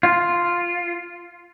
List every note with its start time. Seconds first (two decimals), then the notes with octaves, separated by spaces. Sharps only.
0.03 F4